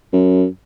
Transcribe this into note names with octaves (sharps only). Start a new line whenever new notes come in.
F#2